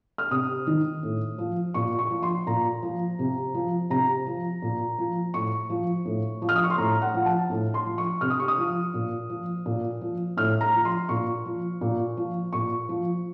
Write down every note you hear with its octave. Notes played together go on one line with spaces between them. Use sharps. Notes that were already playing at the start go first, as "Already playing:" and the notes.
F6
C3 D#6
D#3
A2
F3
A#2 C#6
C#6
F3
C6
A#2 A#5
F3
C3
F3
C3 A#5
F3
A#2
F3
A2 C#6
F3
A2
F3
F6
D#6
C#6
C6
A2 A#5
F#5
F3
A5
A2
C6
F3
C#6
C3 F6
D#6
C#6
D#6
F3
A#2
F3
A#2
F3
A2 F6
A#5
F3
C6
A#2 C#6
F3
A#2
F3
A#2 C#6
F3